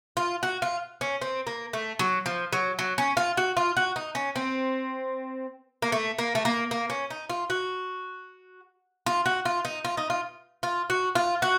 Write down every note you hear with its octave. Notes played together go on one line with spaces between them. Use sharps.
F4
F#4
F4
C#4
C4
A#3
A3
F#3
F3
F#3
F#3
C#4
F4
F#4
F4
F#4
D#4
C#4
C4
A#3
A3
A#3
A3
A#3
A#3
C#4
D#4
F4
F#4
F4
F#4
F4
D#4
F4
D#4
F4
F4
F#4
F4
F#4